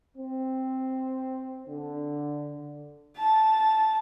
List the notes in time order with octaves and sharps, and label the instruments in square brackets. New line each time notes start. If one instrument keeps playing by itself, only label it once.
[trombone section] C4
D3
[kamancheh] A5